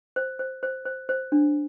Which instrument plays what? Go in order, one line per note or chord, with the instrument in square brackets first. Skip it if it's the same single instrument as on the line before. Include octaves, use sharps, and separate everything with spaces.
[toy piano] C5
C5
C5
C5
C5
D4